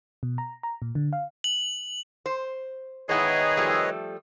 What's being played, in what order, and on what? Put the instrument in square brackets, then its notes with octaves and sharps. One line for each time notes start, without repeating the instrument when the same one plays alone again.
[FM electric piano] B2
A#5
A#5
A#2
D3
F5
[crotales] F#7
[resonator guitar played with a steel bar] C5
[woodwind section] D#3 G#4 [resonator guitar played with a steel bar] G#3 B3 E4 [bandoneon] B4 C#5 D#5
[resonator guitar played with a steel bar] F3 G3 A3